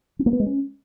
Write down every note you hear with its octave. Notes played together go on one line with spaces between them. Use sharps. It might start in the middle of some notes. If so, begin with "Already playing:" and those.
C4
A#3
B3
G#3
C#4